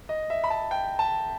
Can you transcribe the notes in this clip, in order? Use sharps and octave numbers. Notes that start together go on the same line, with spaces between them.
D#5
E5
B5
A5
G5
A5